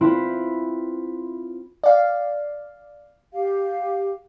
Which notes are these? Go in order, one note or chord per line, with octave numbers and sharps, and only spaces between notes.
C4 E4 F4 B4 B5
D5 F5
G4 F5